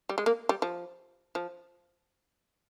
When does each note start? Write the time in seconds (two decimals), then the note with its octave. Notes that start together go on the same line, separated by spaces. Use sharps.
0.09 G3
0.18 G#3
0.26 A#3
0.49 G3
0.62 F3
1.35 F3